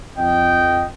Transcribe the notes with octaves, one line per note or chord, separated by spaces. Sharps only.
F2 D#5 G5